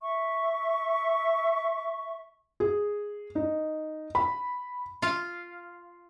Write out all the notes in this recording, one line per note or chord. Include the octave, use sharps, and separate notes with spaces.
E5 C#6
G#4
D#4
B5
F4 F5